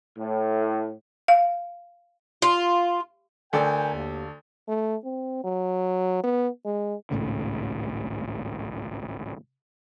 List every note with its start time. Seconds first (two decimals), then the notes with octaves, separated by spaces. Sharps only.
0.18 A2
1.28 F5
2.42 F4
3.53 D2 A4 A#4 D5 G5 G#5
3.93 D#2
4.68 A3
5.04 C4
5.44 F#3
6.24 B3
6.65 G#3
7.11 G#1 C#2 A2 C#3